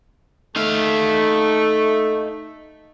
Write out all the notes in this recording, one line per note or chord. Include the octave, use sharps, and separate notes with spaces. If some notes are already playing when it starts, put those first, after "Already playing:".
A3 D#4 F5